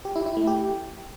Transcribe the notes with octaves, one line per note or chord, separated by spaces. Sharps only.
G4
E4
E4
A3
G4